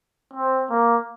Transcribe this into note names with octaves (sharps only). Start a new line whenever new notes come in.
C4
A#3